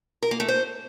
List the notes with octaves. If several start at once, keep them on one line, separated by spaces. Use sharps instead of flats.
A#4
A#3
A3
C5